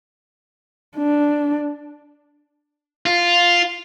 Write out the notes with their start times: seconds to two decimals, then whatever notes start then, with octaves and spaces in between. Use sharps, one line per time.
0.97 D4
3.06 F4